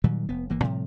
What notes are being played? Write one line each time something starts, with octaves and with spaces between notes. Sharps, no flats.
A#2 D#3 F#3 G3
F1 B3
G1 E3 A#3
A2 C3 F3 G3